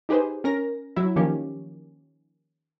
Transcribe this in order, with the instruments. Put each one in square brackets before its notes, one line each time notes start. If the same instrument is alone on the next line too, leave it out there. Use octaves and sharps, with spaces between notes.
[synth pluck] D#4 G4 G#4 B4 C5
C#4 A#4 A#6
F#3 E4
D#3 F3 A#3 C#4 G4